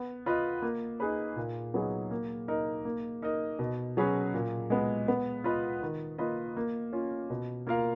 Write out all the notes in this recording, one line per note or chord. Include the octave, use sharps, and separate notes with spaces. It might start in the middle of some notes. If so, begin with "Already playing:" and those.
Already playing: B3
F4 B4 D#5
A#3
D#4 G#4 B4
A#2
F#3 B3 D#4 G#4
A#3
D#4 A#4 D#5
A#3
D#4 A#4 D#5
B2
F#3 C#4 G#4 B4
A#2
G#3 B3
B3
F4 B4 D#5
D#3
A#3 F4 B4 D#5
A#3
C#4 F4
B2
A#3 F4 A#4 F5